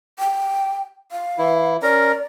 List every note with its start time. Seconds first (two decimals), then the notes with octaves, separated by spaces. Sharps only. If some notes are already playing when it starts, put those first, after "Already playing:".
0.19 G5
1.12 F5
1.38 E3 E4
1.83 C#4 A#4 D5 A#5